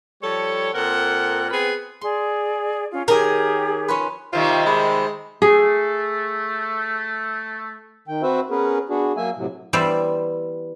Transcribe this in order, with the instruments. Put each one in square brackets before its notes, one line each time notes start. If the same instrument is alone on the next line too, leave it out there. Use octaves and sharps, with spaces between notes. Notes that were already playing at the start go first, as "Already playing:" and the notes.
[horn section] F3 G3 A4 C#5
A#2 C4 A4 A#4 F#5
B3 C4 G#4 B4
[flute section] G#4 D5 [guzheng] C6
[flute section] C#4 F4
[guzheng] D#3 D#5 [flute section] G4 G#4 C#5 [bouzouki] A#4
[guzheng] C#4 F4 B4
[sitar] C3 D#3 G3 [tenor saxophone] F4
[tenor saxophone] G#3 [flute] B5
[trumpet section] A3 [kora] G#4
[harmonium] D#3 G5
C4 F#4 B4 C5 E5
B3 C#4 G#4 A#4 B4
B3 D4 F#4 G#4
F#3 A#3 E5 G#5
A2 C3 F#3
[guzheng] E3 G3 B3 C5 D5 E5